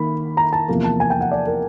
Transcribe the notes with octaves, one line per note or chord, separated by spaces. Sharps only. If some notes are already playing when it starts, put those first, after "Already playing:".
Already playing: D#3 A#3 B5
A#5
A5
E2 C3 F3 A#3
A5
G#5
G5
F#5
D5
A#4